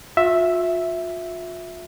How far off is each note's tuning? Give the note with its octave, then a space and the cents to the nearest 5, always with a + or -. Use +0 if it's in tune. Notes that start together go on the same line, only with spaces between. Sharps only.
F4 +40 E5 +0